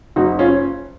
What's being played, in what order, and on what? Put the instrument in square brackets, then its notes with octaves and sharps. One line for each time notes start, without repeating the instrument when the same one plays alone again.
[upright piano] F#1 D#4 F#4
C#4 F4